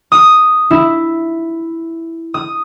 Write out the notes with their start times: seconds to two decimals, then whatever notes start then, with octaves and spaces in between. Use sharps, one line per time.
0.12 D#6
0.71 E4
2.34 D#6